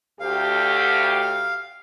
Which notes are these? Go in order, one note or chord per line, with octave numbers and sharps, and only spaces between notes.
D2 G4 F5